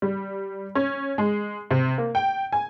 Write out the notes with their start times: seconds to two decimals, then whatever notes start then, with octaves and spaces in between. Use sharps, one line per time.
0.02 G3
0.75 C#4
1.18 G#3
1.71 C3
1.98 A#3
2.15 G5
2.53 G#5